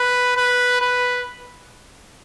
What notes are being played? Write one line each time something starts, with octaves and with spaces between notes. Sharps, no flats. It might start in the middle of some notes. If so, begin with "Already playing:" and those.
Already playing: B4
B4
B4